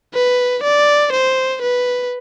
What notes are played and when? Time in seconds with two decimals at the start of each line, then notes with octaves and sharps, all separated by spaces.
0.14 B4
0.63 D5
1.12 C5
1.62 B4